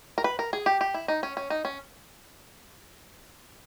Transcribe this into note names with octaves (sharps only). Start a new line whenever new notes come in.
A#4
B4
A#4
G#4
G4
G4
E4
D#4
C#4
C#4
D#4
C#4